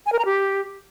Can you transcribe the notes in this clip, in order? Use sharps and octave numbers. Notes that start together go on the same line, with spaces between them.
G#5
A#4
A#5
G4